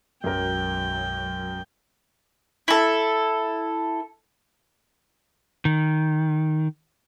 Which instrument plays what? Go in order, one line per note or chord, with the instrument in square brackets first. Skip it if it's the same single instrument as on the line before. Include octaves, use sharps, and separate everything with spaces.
[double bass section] B1 F#3 G#3 [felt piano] F#2 A#4 [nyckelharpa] G5
[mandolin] E4 A4
[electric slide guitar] D#3